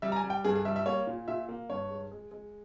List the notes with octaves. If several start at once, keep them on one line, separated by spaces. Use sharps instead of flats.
G3 E5
A#5
G#5
G3
G5
G2 G#4
G#4
G3 E5
E5
A#3 C#5
A#2
A#2 E5
A#3
G2 C#5
G#3
G#3
G#3